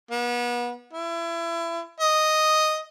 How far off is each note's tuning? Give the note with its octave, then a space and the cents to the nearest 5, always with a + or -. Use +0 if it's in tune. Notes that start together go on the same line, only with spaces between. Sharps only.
B3 -35
E4 +30
D#5 +0